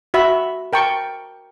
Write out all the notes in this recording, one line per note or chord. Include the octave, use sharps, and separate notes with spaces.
F#4 E5 B5
A#4 G5 A5 C#6